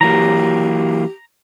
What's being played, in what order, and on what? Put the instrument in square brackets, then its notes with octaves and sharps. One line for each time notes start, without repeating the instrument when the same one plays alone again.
[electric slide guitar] E3 F#3 A#3 [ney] G4 [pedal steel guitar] A#5